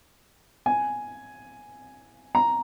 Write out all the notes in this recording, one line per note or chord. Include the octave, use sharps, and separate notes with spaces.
G#5
A#5